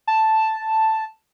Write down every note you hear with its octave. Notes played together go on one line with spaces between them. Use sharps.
A5